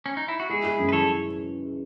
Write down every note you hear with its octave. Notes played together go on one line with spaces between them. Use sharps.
C#4
D#4
E4
F#4
G#3 E4 G#4
G#3
F#2
B4
E3 A4 C#5